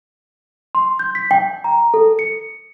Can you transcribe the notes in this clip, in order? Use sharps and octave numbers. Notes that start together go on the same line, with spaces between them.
C6
G6
B6
G5
A#5
A4
C#7